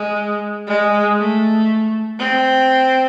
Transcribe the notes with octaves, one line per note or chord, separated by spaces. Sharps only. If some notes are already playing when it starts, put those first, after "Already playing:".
Already playing: G#3
G#3
A3
C4